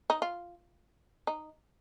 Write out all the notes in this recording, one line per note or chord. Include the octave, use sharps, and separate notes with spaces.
D#4
F4
D#4